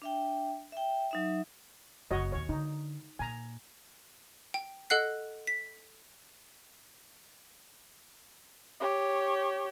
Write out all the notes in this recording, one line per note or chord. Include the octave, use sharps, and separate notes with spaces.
D4 E5 G5
E5 G5
F#3 D#4 E5
F#1 A#3 F#4 C#5 D#5
D#2 A#2 C#5
D3 D#4
A#2 G#5 A#5
G5
A4 D#5 F#5 F#6 C7
B6
G4 C#5